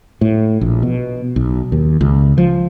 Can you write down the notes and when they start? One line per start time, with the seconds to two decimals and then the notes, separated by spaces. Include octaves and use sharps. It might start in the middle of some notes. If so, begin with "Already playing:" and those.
0.21 A2
0.61 A#1
0.83 B2
1.36 B1
1.72 D#2
2.01 C#2
2.38 F3